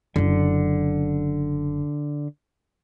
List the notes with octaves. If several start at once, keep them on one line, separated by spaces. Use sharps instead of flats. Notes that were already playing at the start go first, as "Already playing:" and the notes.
F#1 D3 E4